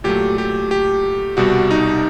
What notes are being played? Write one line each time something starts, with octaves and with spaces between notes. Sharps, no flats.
A#2 F#3 A3 G4
G4
G4
C2 B2 G3 F#4
D#4